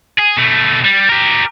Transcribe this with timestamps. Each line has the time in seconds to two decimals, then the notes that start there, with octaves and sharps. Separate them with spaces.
0.18 G#4
0.37 B2 A3
0.84 G3
1.09 G4 A#4